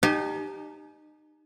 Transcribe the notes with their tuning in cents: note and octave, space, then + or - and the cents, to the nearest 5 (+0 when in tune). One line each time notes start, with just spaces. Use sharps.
D#4 -30 G4 +0 G#5 +40